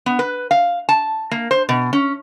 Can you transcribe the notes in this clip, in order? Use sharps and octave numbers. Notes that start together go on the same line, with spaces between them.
B3
B4
F5
A5
A#3
C5
B2
C#4